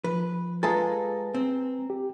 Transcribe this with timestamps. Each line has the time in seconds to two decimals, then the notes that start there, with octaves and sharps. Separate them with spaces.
0.04 F3 B4
0.63 G#3 F4 A4 B4 G#5 A#5
1.35 C4
1.90 G4